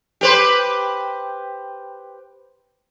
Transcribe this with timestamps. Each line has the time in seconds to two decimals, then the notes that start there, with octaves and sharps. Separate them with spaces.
0.21 G4 B4 C5